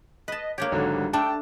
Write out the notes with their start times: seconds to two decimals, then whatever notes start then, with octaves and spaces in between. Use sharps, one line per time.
0.28 B4 D#5 A5
0.58 A#3 D4 G4 C#5
0.72 G#1 D3 F#3
0.94 G3
1.13 A3 D4 G5 A5